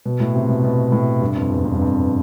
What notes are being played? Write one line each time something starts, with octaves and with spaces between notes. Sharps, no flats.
B2
A2
C3
B2
B2
A2
G2
F2
E2
F2
G2
F2